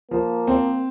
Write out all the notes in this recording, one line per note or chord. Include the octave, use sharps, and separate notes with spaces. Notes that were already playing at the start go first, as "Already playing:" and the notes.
F3 A#3
C4